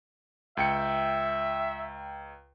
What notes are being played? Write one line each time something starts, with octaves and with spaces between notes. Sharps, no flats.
C#2 E5 G5 C#7